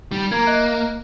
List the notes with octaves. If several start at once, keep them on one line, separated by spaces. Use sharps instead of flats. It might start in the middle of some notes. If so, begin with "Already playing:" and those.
G3 D#4
A#3 A#5 G#6
D#5 E5 F#6